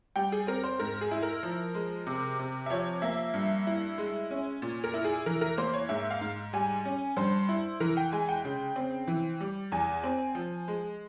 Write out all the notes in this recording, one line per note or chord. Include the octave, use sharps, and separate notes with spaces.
G3 G5
G#4
C4 A#4
C5
G#2 A#4
G#4
E4
A#4
F3
G#3
C3
C3
E5
F3 C#5
A#3 E5
G2
E4
G#3
C#4
A#2
A#4
E4
G#4
E3 A#4
A#4
A#3 C5
C#5
G#2 E5
F5
G#2
G3 G#5
C#4
G2 C5
E4
E3 A#4
G5
G#3 G#5
G5
C#3
C4
E3
G3
E2 G#5
C4
F3
G#3